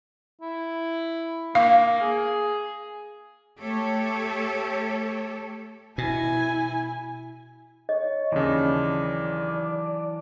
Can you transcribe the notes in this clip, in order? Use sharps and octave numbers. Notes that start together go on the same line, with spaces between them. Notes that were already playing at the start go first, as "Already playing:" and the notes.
E4
A#3 F5
G#4
A3 G4 A4 C#5
B2 E4 G#5
C#5 D#5
D#2 C#3 E3 F#3 D4 D5